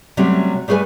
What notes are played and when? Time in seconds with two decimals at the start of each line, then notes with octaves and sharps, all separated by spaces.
0.17 C3 F#3 G3 A3 C4 C#4
0.68 G3 A3 G#4 B4 G#5